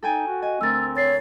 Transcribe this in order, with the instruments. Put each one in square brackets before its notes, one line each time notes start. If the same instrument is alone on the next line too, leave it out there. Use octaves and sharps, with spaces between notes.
[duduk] D#4 [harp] A4 G5 G#5
[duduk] F#4
[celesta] D#5 [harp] G#5
[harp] D2 A#4 [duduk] C4 [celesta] E6 A6
[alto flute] C#5 [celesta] A6 C7